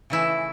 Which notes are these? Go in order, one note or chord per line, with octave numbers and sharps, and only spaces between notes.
C#3 E3 A3 E4